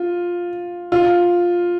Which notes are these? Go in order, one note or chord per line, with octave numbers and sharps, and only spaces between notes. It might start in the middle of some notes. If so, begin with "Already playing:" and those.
Already playing: F4
F4